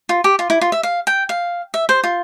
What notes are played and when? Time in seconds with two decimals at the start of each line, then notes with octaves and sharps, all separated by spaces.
0.09 F4
0.24 G4
0.39 F4
0.50 E4
0.61 F4
0.72 E5
0.83 F5
1.07 G5
1.29 F5
1.74 E5
1.89 C5
2.04 F4